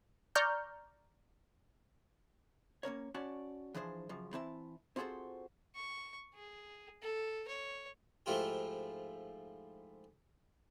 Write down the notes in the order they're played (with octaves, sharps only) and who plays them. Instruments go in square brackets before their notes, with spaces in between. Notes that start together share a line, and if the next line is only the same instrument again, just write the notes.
[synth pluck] D5 A#5 C#6 F6 G6
[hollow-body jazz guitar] A#3 C#4 A#4 C#5
C#4 F#4 C#5 D5 A5
E3 F3 D4 G#4 C5
F#2 C#3 F3
E3 C4 E4 A5
C4 F4 F#4 G#4 A4 C5
[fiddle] C#6
G#4
A4
C#5
[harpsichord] G#2 F3 A3 E4 F4 G4